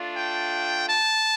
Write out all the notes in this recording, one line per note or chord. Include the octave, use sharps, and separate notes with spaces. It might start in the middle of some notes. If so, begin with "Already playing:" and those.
Already playing: A3 D4 F4
G5
A5